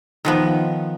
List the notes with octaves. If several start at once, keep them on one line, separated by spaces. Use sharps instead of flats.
D#3 F3 B3